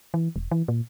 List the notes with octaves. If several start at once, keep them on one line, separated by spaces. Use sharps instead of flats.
E3
E1
E3
A#2